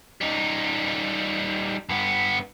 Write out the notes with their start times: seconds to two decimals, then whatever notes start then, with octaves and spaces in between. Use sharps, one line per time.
0.21 G3 D#4
1.89 G2 B3